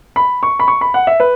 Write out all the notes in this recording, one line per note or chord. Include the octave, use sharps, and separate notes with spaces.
B5
C#6
B5
C#6
B5
F#5
E5
B4